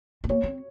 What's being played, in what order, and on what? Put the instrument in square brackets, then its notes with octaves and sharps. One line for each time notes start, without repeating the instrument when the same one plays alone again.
[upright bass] C4
[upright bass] A#3 [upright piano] C#5
[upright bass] C4